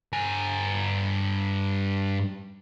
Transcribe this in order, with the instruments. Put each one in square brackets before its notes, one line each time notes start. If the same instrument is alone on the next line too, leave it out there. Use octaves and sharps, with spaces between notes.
[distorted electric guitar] G2 G#5